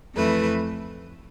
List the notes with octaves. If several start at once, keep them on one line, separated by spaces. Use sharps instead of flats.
F2 E3 A3 E4 B4